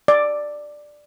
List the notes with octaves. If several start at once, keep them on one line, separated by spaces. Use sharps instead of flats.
D5